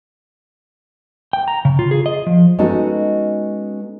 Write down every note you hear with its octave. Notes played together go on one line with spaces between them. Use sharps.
G5
A#5
C#3
F4
G#4
D#5
F3
G#3 B3 C#4 D#4 F#4 A4